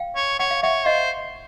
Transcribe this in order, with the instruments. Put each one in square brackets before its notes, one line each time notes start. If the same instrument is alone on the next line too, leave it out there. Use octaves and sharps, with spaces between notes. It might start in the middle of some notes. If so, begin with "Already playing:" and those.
Already playing: [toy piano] F5 G5
[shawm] C#5
[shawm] C#5 [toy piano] F#5
[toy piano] F5
[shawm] C#5 [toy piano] E5 F#5
[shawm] C5 [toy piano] D#5 F5